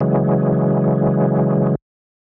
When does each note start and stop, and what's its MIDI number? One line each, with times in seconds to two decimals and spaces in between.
0.01 1.75 49
0.01 1.75 52
0.01 1.75 54
0.01 1.75 56